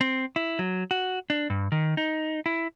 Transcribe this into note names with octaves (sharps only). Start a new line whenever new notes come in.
C4
E4
F#3
F#4
D4
G2
D#3
D#4
E4